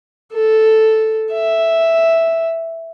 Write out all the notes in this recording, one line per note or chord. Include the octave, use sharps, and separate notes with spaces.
A4
E5